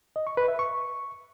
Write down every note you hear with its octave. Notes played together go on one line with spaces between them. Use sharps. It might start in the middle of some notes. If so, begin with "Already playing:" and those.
D#5
C#6
B4
E5
C#6